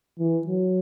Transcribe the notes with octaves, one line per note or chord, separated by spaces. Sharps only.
E3
F#3